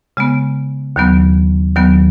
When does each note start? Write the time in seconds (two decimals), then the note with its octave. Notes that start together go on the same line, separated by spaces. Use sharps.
0.17 C#3 G#3 B3
0.96 D#2 D#3 F#3 B3
1.75 D#2 D#3 F#3 B3